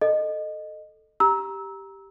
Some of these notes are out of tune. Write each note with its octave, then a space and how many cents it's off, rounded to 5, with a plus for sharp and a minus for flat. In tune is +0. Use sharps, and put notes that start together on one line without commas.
A4 +0 D#5 -15
G4 +0 A#5 +15 E6 -20